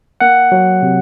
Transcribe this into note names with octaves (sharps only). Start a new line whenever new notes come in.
A#3 F#5
F#3
C3